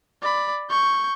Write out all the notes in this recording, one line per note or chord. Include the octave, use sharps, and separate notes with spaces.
D5 B5
C#6 G6